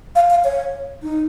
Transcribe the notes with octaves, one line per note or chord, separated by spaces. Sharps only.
F5
F5
C#5
D#4